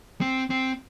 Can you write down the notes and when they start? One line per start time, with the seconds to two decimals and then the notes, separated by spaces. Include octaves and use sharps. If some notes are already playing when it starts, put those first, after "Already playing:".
0.21 C4
0.50 C4